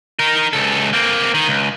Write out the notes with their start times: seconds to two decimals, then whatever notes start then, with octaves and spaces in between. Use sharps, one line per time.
0.19 D#4 A#4
0.53 C#2 A4
0.93 A#3 C4
1.34 D#3
1.48 C#2